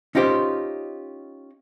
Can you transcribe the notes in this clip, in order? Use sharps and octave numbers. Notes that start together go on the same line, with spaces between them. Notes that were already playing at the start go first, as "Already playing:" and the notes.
C#4 D#4 F4 G4 C5